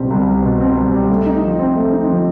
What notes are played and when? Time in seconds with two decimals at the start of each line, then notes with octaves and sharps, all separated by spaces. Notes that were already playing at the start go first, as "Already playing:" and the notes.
Already playing: C2 B2 G3 C4
0.10 C2
0.27 G3
0.43 B2
0.60 C4
0.77 C2
0.93 G3
1.09 A3
1.26 D#4
1.43 F3
1.59 C4
1.76 A3
1.92 D#4
2.09 F3